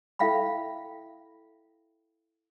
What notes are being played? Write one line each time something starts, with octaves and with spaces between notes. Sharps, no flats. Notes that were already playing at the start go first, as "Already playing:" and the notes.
E4 A4 E5 F5 G5 B5